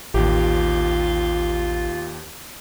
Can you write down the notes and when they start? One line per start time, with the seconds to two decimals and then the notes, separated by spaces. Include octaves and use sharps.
0.14 A1 D#2 F4 G4